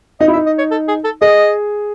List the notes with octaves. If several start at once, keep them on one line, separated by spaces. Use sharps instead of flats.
D#4 D#5
E4
D#4 E5
D#5
C#5
A4
G#4
A4
G#4 D#5